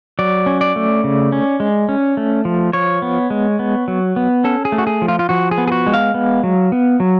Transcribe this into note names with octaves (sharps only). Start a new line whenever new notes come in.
F#3 D5
C#4
D5
A3
C#3
C#4
G#3
C#4
A3
F3
F3 C#5
B3
G#3
B3
F#3
B3
C#4 A4
G#4
A3
F#4
G#4
F3
F4
F4
F3 F#4
G#4
B3
G#4
F#4
G#3
F5
B3
F#3
B3
F#3